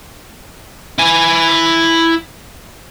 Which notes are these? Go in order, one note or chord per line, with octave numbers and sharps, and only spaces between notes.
E4 G#5